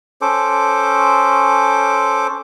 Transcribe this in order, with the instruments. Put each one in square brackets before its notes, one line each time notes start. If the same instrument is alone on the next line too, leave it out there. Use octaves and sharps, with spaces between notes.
[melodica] C#4 A4 C5 D6